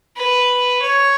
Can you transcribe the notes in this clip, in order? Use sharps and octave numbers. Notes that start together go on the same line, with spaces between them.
B4
C#5